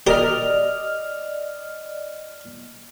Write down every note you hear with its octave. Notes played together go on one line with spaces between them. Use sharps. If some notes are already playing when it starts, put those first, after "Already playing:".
G4 A#4 D5 D#5 F6